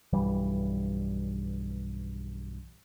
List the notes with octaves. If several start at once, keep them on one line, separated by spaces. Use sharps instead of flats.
B1 G2 E3 G3